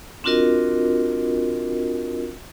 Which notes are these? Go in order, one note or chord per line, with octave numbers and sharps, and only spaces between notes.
C4 D4 F4 F#4 A#4 D#5